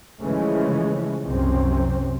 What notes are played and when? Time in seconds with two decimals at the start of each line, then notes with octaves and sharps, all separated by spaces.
0.23 C#3 E3 F3 G#3 A3 C#4
1.26 C2 F#2 C3 C4 C#4